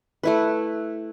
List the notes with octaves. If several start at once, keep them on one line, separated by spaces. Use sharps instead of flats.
A3 E4 B4